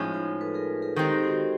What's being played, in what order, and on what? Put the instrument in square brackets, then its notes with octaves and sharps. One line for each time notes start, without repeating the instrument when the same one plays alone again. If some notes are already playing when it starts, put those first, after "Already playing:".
Already playing: [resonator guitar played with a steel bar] A2 F3 G#3 C#4 [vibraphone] D#4
[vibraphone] F4
A4 B4
G#4 A#4
G#4 A#4
[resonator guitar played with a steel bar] D#3 G#3 C4 D#4 [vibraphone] G4 A4
[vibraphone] F#4 G#4